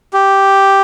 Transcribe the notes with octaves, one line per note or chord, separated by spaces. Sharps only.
G4